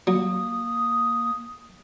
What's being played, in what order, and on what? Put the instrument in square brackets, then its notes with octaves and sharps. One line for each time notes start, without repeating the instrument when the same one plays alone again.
[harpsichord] F#3 [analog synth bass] A#3 [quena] D#6